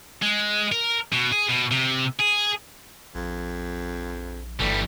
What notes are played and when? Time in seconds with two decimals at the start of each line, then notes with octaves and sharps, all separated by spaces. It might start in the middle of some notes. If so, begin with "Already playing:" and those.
0.22 G#3
0.72 A#4
1.13 B2
1.32 G#4
1.49 B2
1.71 C3
2.19 G#4
3.15 A#1 F2
4.60 G1 E3 G3 A3